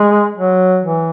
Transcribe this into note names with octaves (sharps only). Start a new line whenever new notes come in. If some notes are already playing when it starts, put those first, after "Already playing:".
Already playing: G#3
F#3
E3